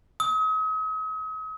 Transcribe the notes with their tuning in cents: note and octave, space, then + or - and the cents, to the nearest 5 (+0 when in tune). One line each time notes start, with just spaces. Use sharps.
D#6 +40